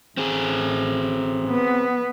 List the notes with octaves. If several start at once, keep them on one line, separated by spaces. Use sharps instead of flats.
A1 C4 G#4
B3